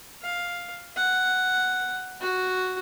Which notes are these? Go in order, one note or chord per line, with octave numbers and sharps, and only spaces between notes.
F5
F#5
F#4